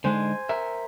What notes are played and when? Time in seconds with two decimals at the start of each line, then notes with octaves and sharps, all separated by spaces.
0.04 D3 G#3 D#4 C5 G#5
0.49 A#4 E5